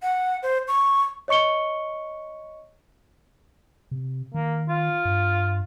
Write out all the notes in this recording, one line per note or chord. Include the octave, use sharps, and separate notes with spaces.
F#5
C5
C#6
C#5 D#5 C#6 C#7 G7
C3
D#3 A#3
F4
G2